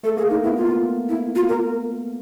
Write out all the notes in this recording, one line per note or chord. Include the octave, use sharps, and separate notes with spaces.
A3 A4
A#3 G#4
D#4
B3 E4
F4
E4
F4
A#4